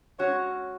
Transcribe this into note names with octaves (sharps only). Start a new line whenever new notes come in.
G#3 C#4 F#4 C#5